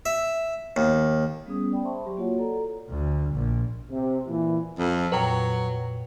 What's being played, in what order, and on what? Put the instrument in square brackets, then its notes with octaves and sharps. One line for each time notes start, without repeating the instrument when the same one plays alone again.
[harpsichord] E5
D#2
[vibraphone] G3 B3 C#4 G#4 D#6
D5 G5 B5
C5 E5 A5 C6 C#6
F#3 G4
A#3 F4 F#4 C#5 F#5
A4 D5 A#5
[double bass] D2
A#1
[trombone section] C3
A#2 E3
[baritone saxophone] F2
[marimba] F2 A#2 A#5 [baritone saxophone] F#3 [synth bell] B4 G5